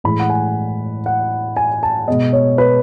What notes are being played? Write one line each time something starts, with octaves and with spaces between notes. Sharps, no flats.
A2 E3 G#3 B5
F#5
G#5
F#5
G#5
A5
B2 G#3 B3 D#5
C#5
B4